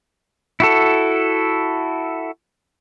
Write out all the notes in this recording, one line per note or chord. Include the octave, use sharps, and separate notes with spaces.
E4 F#4 A4